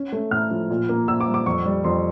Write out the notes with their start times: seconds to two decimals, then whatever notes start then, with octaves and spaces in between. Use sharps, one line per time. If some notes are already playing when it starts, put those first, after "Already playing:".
Already playing: C#4
0.13 A3
0.31 A2 F6
0.51 F3
0.70 A#2
0.89 A#3
1.08 A#2 E6
1.20 D6
1.27 G3
1.34 D6
1.46 F2 C#6
1.65 G3
1.84 F2 C6